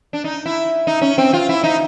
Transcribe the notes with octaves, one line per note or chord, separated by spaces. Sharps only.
D4
D#4
E4
D#4
C#4
C4
F4
E4
D#4